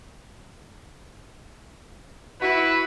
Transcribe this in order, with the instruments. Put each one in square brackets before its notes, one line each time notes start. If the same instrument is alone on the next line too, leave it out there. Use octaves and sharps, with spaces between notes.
[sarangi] E4 [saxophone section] F#4 [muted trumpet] B4